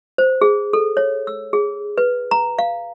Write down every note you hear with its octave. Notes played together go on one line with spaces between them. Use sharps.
C5
G#4
A4
C#5
E6
G#4
B4
A#5
F5